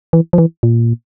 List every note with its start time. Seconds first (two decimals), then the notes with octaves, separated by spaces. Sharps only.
0.13 E3
0.33 F3
0.38 E3
0.63 A#2